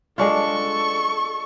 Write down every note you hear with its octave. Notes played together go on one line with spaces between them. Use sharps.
G#3 D4 F4 A4 C#6